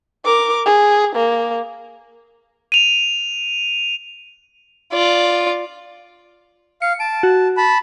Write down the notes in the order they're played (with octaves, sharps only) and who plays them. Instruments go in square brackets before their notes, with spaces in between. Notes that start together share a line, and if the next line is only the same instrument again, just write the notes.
[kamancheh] A#4 D6
G#4
A#3
[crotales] D#7 F7
[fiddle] F4 D5
[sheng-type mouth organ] F5 [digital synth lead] C#7
[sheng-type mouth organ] A5 [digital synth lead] D7
[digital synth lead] F#4
[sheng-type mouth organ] A5 B5